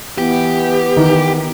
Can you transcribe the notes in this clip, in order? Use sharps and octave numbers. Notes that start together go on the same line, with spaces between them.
E3 B3 G4
D#3 E3